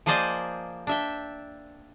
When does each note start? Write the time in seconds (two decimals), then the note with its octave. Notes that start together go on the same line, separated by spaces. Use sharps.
0.06 F3 A#3 G#4 C5 D5 D#5
0.87 D4 E5 G5